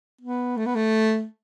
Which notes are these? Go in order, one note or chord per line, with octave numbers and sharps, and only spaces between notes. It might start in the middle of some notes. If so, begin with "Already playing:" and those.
B3
A3
B3
A3